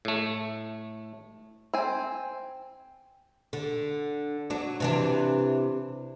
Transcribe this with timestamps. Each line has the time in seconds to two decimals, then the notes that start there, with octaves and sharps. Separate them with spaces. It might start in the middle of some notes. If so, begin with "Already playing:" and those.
0.05 A2 A3
1.74 C4 G#5
3.53 D3
4.50 F#3 D4
4.80 C3 E3 D4